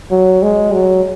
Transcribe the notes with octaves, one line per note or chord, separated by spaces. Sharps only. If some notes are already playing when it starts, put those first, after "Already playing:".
F#3
G#3
F#3